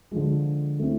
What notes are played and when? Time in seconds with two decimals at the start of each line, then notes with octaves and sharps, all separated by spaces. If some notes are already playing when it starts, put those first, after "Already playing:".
0.11 D3 F3 G#3
0.79 A3 C4 E4